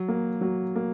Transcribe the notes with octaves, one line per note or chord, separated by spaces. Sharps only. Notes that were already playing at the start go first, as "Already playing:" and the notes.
Already playing: F#3
A#3
F#3
A#3